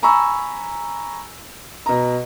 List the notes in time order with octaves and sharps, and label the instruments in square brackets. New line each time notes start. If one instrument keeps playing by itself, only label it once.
[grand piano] G#5 A#5 B5 C#6 E6
B2 A#5